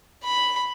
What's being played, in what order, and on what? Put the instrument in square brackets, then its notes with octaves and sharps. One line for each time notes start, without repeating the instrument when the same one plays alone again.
[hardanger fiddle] B5